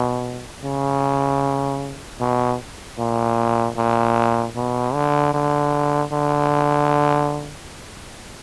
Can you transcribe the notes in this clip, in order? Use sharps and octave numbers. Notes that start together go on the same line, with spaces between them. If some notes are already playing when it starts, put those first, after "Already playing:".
Already playing: B2
C#3
B2
A#2
A#2
B2
D3
D3
D3